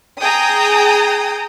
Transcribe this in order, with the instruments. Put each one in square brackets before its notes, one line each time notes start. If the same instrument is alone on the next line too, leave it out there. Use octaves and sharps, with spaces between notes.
[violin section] G#4 G5 A#5 D#6